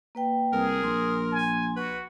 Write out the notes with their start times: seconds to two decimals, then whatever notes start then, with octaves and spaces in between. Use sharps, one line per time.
0.15 A#3 B4 G5
0.53 C2 G#4 A#4
0.83 A#1 C6
1.32 G#5
1.77 F#4 B4